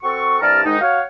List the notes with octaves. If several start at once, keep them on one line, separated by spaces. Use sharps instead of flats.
C4 F#4 A4 C#6
C2 G2 D5 A5 A#5 F6
G#2 D#3 G#3 D#4
F#4 C#5 F5